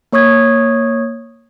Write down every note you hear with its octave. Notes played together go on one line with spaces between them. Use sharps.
A#3 C#5 C#6 D#6 G#6